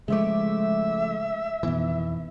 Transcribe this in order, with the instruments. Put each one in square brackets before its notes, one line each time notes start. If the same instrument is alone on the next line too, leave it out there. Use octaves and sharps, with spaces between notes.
[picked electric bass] C#3 F3 A3 [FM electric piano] G#3 D6 [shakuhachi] E5
[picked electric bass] F2 E3 [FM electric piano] B2 D#3 B3